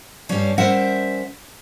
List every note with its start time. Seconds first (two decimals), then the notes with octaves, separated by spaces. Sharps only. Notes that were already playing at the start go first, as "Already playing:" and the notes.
0.29 G2 G3 C#4 C#5 F5 A5
0.58 G3 C#4 A#4 C5 E5 F#5